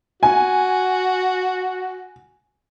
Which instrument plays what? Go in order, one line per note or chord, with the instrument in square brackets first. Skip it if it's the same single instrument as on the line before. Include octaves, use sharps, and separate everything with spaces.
[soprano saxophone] F#4 [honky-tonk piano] G#5